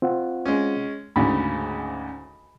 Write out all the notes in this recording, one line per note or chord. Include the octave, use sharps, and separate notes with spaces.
C4 F4 F#5
G#3 C#4
D2 G#2 C#3 B5